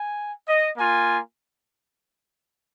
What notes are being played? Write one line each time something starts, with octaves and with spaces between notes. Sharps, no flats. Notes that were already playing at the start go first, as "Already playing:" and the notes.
Already playing: G#5
D#5
A#3 F4 G#5